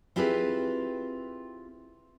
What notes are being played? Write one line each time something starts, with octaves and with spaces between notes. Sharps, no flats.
C4 E4 F4 G4 G#4 B4